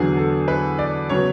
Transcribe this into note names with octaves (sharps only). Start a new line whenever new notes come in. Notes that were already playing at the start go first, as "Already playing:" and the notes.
Already playing: E2 D3 F#3 B3 G#4
A4
B4
D5
C#3 F#3 B3 C#5